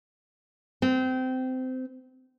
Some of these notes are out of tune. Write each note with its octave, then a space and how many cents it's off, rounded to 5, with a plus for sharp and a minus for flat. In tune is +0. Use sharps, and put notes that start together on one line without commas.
C4 -25